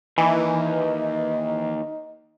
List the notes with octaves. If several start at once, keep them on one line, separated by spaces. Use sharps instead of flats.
D#2 E3 D#4